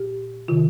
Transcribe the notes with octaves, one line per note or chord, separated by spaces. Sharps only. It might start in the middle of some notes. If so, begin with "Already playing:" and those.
Already playing: A#2 G4
C3 D#3 F4